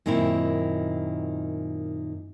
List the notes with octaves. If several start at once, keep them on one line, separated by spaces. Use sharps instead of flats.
F#2 A#2 D#3 C4 E4